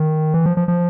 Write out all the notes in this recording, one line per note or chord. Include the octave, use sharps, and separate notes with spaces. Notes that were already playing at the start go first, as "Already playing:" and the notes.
Already playing: D#3
E3
F3
F3
F3